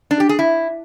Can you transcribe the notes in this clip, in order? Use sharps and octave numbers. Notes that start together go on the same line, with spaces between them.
D4
G4
G#4
E4